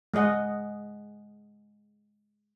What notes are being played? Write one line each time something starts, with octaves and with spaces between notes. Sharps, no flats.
G#3 G#4 D#5 F#5